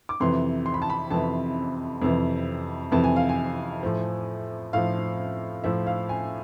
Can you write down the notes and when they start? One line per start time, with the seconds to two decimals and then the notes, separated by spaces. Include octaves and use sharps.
0.09 D6
0.20 F2 C3 E3 C6
0.66 C6
0.74 B5
0.82 A5
0.90 B5
1.11 F2 C3 E3 A5
2.02 F2 C3 E3
2.92 F2 C3 E3 A5
3.04 G#5
3.16 F5
3.29 G#5
3.83 A2 F3
4.73 A2 F3 F5
5.64 A2 F3 E5
5.87 F5
6.09 G#5